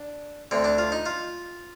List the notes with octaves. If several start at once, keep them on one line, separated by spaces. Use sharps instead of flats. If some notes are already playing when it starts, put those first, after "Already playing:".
Already playing: D4
D2 D3 C4
D4
F4
D#4
F4